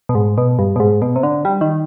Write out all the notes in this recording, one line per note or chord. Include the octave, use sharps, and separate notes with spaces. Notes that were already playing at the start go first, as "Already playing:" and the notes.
B2
G#2
B2
G2
B2
G#2
B2
C3
D3
G3
D#3